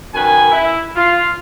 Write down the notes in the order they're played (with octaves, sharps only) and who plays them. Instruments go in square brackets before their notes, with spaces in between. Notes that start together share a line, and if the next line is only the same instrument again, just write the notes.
[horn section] F#2 D#3 B4 G#5
E4
F4